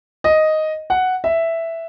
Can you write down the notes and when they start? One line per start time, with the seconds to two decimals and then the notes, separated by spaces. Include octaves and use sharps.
0.24 D#5
0.90 F#5
1.24 E5